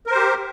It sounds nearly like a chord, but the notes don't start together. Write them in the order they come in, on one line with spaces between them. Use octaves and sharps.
A#4 C5 G4